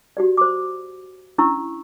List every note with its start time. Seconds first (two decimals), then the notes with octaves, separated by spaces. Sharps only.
0.17 F#4 G4 D5
0.37 C5 D6
1.38 C#4 D4 E4 A#5 C#6 E6